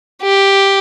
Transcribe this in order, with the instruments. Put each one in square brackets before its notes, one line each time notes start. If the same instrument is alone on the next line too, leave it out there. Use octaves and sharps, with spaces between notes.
[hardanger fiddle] G4